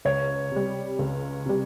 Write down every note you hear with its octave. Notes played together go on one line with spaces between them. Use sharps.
C#2 C#5
C3 G3
C#2
C3 G3